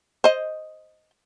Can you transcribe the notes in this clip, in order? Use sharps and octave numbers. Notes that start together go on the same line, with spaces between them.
C5 D#5